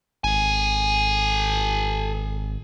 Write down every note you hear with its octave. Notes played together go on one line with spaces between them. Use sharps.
G#1 A4 G#5